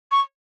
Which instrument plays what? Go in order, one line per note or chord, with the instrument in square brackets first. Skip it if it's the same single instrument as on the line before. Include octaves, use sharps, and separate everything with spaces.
[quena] C#6